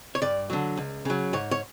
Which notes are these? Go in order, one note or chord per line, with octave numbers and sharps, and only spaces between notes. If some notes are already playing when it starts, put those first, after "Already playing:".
C#5
G2 D5
D3 F#3
C#2
C#3 F#3
G#2 C#5
C#5